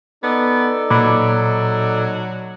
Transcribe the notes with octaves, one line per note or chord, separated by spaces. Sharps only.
B3 D#4 A4 D5
A#2 F#3 B5 D6